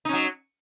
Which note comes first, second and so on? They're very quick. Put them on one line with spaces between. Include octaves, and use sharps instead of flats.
D#4 C#4 F#3